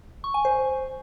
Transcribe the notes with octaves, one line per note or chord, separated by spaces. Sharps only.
C#6
G#5
C5